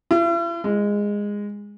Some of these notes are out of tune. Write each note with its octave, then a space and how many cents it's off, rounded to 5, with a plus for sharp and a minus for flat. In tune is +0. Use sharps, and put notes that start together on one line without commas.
E4 +45
G#3 -15